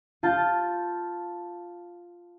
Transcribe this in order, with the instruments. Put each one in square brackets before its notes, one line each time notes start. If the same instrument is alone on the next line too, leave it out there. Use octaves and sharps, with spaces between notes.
[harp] F4 A5 G6